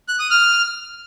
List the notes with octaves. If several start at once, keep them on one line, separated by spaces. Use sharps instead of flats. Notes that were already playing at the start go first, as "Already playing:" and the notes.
F#6
D#6
F6